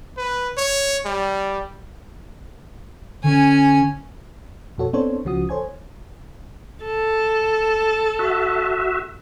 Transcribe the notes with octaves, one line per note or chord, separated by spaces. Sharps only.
B4
C#5
G3
D3 C#4 G#5
F2 B2 F#4 A4 C#5
B3 C4 D4 A4 C5 C#5
C#2 C#3 F3 F#4 D#6
A4 C5 C#5 G#5 G#6
A4
F#4 E5